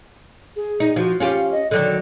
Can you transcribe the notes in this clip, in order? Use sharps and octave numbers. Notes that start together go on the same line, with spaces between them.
G#4
D#4
F3 F#4
C#4 F4 G4 F5
D#5
D3 D#3 F#3 D5